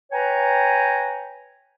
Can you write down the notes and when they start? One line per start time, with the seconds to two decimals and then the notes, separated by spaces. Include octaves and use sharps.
0.11 B4 C#5 G5 G#5 A#5